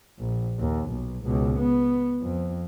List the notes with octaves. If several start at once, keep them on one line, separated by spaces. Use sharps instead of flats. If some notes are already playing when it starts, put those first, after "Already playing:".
A#1
D#2
B1
C#2 B2
B3
F2